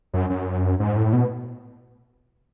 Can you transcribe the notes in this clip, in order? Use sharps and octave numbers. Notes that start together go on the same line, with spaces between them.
F#2
F#2
G#2
A2
B2